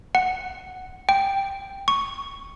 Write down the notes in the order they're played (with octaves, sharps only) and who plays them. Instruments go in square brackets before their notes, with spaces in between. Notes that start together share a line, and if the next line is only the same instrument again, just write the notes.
[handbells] F#5
G5
C#6